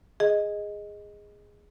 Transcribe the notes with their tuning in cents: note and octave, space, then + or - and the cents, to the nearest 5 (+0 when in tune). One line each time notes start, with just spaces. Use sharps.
G#4 -10 D#5 +0